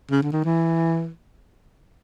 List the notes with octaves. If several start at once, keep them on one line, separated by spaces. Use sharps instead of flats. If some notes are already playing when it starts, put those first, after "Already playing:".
C#3
D3
D#3
E3